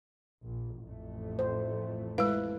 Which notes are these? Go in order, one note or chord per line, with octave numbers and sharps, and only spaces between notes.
A#1
A1 F2 A3
C5
G#3 E4 B4 F5